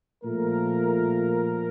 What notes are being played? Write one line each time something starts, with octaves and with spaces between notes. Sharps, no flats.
A#2 F3 A3 A#4